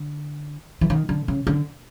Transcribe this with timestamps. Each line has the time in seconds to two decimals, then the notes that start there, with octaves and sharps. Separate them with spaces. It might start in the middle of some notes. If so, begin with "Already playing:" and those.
Already playing: D3
0.81 E3
0.90 D#3
1.09 D3
1.28 C#3
1.47 D3